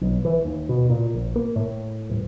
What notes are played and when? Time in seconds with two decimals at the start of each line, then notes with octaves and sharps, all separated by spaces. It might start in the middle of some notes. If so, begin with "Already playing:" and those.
0.01 B1
0.25 E3
0.45 D#2
0.69 B2
0.90 A#2
1.14 A#1
1.36 A#3
1.56 A2
2.10 D#1